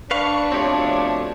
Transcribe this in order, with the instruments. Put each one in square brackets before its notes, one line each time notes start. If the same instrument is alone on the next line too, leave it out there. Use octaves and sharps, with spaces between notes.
[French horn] D4 [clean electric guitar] B4 F5 [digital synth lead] C#6
[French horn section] B2 F3 A3 [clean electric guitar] C4 G4 [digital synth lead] C#5